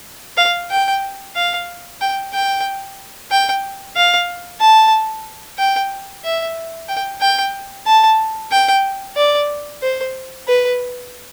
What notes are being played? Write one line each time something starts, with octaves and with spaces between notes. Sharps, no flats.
F5
G5
F5
G5
G5
G5
F5
A5
G5
E5
G5
G5
A5
G5
D5
C5
B4